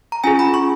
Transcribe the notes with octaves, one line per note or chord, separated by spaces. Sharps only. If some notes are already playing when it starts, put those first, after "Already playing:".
A#5
C#4 F4 G#4 G#5
B5
C#6